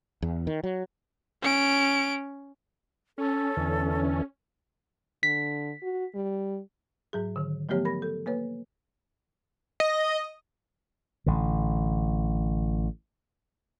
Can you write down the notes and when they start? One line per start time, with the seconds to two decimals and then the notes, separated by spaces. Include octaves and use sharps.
0.22 E2
0.47 D#3
0.64 F#3
1.42 C#4 D7
3.18 C#4 A4
3.57 E2 D3 E3
5.23 D3 B6
5.82 F#4
6.15 G3
7.13 G#2 F#3 G#4
7.36 D3 D#3
7.69 F3 F#3 A3 B3 G4 C#5
7.85 A#4 B5 A#6
8.02 A4
8.26 A#3 B4 C#5
9.80 D#5
11.26 A1 D3